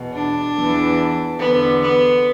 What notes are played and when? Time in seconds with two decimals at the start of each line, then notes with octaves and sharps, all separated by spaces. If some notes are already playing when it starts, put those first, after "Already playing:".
Already playing: E2 B2
0.13 D4
0.55 E2 E3
1.39 E2 D3 B3
1.80 B3